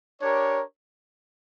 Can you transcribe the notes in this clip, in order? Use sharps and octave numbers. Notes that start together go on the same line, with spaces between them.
D4 G4 A#4 C#5